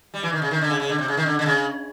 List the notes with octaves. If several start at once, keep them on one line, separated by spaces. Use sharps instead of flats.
G3
E3
D#3
C#3
D#3
D3
C#3
C#3
D3
C3
C#3
D#3
D3
D3
C#3